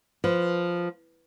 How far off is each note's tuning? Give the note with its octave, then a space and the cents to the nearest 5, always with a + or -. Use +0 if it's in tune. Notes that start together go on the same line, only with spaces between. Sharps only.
F3 +0 B4 +10